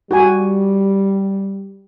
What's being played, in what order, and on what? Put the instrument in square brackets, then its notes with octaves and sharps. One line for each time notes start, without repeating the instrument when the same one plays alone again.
[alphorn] G3 [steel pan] F#4 G4 G#5